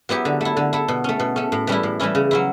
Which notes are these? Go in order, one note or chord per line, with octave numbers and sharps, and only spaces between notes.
F#3 B3 E4 G4
D3
A3 E4
D3
A3 E4
B2
A3 C#4
B2
A3 C#4
A2
E3 G3 C#4 E4
A2
E3 G3 C#4 E4
C#3
F#3 C#4 E4